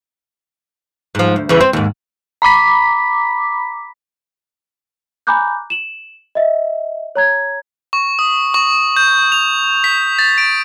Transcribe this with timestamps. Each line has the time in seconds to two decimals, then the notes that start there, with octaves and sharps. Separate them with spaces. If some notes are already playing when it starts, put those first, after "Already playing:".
1.15 G#2 F3
1.36 D2
1.49 E2 C#3 E3
1.61 C4
1.73 D#2 G#2
2.42 A#5 B5 D6 B6
5.27 G#5 A#5 B5 D6 F#6 G6
5.70 E7 F#7
6.35 D#5 E5
7.16 C#5 A#5 G#6
7.93 C#6
8.19 D#6
8.54 C#6
8.97 G6
9.32 F7
9.84 B6
10.19 A6
10.38 D7